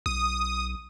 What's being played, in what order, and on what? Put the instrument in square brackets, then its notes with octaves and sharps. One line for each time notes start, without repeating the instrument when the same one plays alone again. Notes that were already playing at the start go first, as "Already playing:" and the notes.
[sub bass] B1 [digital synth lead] D#6